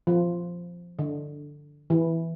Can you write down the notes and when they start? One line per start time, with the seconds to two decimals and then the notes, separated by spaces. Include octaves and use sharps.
0.07 F3
0.99 D3
1.90 E3